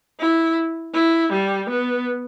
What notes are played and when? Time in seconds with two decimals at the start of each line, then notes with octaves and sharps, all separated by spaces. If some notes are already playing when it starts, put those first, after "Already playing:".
0.20 E4
0.94 E4
1.32 G3
1.69 B3